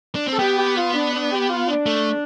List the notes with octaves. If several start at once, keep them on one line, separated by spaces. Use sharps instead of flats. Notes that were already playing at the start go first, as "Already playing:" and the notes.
D4
C4
A4
B3 G4
G4
F4
D4
D4
G4
F4
D4
A3